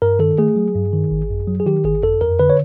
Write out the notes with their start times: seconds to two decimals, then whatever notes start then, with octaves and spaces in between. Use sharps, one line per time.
0.02 G2 A#4
0.19 D#3 A4
0.38 A3 G#4
0.56 F#3
0.75 G2
0.93 D#3
1.11 G#1
1.30 F#2
1.48 F#3
1.60 G#4
1.66 D#3 G4
1.84 G#1 G#4
2.02 F#2 A4
2.21 F2 A#4
2.39 D3 B4
2.50 C#5